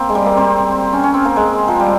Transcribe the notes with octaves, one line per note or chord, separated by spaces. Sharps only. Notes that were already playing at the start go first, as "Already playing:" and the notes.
Already playing: A#3 C4
G#3
G3
A#3
C4
C#4
C#4
C4
A#3
G#3
F3
G3